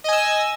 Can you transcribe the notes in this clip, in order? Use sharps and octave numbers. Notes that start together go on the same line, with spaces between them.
D#5 G#5 E6